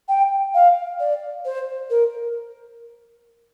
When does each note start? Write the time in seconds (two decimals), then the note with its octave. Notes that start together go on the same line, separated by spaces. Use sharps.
0.08 G5
0.54 F5
1.00 D5
1.45 C5
1.90 A#4